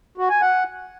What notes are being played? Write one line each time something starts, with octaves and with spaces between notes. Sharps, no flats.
F#4
G#5
F#5